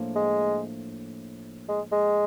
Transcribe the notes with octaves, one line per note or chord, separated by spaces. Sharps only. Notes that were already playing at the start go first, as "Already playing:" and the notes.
Already playing: A2 F3 A#3 D4
G#3
G#3
G#3